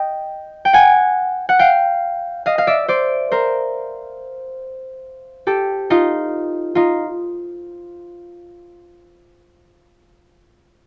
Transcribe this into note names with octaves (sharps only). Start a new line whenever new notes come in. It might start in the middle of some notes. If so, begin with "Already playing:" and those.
Already playing: D#5 G5
G5
F#5 G#5
F#5
F5 G5
D#5 F5
F5
D5 E5
C5 D5
A#4 C5
G4 A4
D#4 F4
D#4 F4